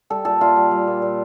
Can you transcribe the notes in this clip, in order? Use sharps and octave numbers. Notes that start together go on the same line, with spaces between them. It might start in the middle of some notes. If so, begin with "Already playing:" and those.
G3 A4
A#2 A4
A#2 F4
G3
G3
A#2
A#2